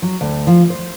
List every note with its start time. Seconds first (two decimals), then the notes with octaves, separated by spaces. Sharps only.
0.02 F#3
0.21 D2
0.47 F3
0.70 C5